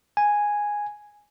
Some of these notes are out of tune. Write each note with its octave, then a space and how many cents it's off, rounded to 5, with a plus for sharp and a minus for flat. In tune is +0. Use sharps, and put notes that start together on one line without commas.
G#5 -5